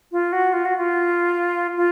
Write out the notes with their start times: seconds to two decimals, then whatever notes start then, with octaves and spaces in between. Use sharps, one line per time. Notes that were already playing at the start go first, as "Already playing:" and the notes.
0.12 F4
0.33 F#4
0.53 F4
0.65 F#4
0.77 F4
1.77 F4